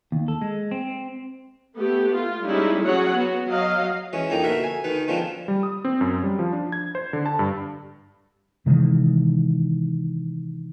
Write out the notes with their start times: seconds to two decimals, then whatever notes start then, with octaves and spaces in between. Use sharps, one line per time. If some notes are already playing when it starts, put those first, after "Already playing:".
0.12 D#2
0.28 A4
0.41 G#3
0.71 C4
1.76 A3 B3 G4
2.13 F4
2.43 G3 G#3 C#4 D#4 E4
2.84 F#3 C#4 F#4 G#4 C#5 F#5
3.15 B3 F#4
3.46 F#3 D#5 F5
4.13 E3 G#3 C#4
4.30 F2 A#3 D#4 G5 A#5
4.43 D2 B2 A#4 E5 F#5
4.64 G#5
4.84 D2 D#3 D#4 B4
5.08 F3 G#3 B3 C4 D4 F4
5.48 G3
5.63 D#6
5.85 C4
6.01 F#2
6.23 G3
6.39 F3
6.53 D4
6.72 G#6
6.95 C5
7.13 D3
7.26 A5
7.39 G2
8.66 C3 D#3 E3 G#3